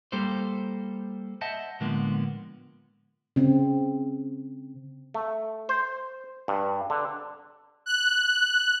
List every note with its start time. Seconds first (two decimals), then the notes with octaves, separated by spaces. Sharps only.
0.12 G3 A#3 G4 A4 C5
1.41 C5 D#5 E5 F#5 A5
1.80 A2 D3 F3 G#3 A#3 B3
3.36 C#3 C4
5.14 A3
5.69 C5
6.48 G2
6.90 D3
7.86 F#6